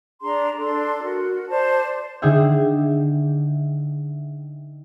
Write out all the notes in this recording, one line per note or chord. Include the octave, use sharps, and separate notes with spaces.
D4 G#4 A#5 C6
D4 A4 C6
F#4 A#4
C5 D5 A5
D3 D#4 G#4 E5 G5